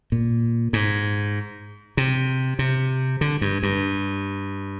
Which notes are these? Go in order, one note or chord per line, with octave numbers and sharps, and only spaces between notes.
A#2
G#2
C3
C3
D3
G2
G2